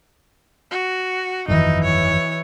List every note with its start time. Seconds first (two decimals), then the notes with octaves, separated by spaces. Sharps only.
0.71 F#4
1.48 G1 F2 D#3 E3 D#4
1.84 C#5